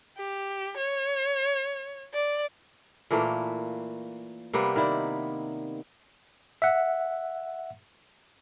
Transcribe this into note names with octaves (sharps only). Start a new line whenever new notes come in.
G4
C#5
D5
A#2 E3 A3 A#3
C3 G3 A#3 B3
D#3 E4 D5
E5 F#5